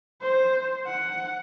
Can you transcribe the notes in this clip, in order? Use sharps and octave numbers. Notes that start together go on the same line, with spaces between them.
C5
F#5